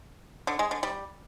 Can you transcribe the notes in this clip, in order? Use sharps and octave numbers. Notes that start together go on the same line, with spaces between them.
D3
G#3
D3
G3